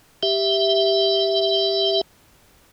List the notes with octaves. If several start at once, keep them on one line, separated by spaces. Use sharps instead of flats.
G4 E5